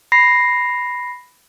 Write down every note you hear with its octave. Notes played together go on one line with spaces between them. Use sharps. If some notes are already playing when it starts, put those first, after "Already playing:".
B5 A#6 C7